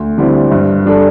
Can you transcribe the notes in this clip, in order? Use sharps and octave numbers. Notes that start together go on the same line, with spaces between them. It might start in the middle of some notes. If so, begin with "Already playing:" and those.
Already playing: D2
D3 G3 C4 E4
G2
G3 D4 A4